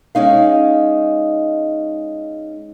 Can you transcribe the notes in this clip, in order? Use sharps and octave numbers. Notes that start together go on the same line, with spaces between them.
G#3 C#4 D#4 F5